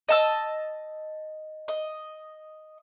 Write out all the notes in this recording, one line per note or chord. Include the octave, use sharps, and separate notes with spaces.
D#5 A5 E6
D#5